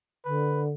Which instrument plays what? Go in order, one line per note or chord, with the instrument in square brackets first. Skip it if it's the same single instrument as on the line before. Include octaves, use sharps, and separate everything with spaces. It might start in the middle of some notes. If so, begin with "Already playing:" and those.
[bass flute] D3 [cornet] B4